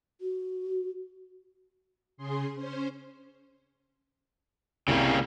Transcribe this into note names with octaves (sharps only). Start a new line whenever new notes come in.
F#4
C#3 G#4 C6
C#4 C5
C2 C#3 G3 A#3